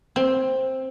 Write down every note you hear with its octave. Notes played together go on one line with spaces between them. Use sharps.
C4